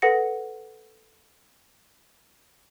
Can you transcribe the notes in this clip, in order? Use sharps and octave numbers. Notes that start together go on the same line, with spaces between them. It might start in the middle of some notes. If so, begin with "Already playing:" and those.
A4 B4 F#5 A#6 C#7